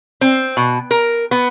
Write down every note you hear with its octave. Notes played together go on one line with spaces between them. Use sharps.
C4
B2
A#4
B3